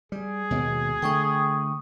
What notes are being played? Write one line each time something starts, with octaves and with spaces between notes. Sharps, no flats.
G3 G#4
D#2 B2 G#3
D3 A3 G5 C#6 D#6